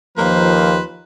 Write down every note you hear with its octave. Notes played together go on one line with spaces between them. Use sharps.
D#2 F3 A#3 B4 C5